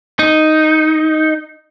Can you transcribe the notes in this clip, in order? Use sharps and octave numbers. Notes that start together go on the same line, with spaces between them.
D#4